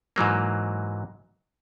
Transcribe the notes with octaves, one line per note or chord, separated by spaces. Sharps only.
G#2 E3 F#3 A#3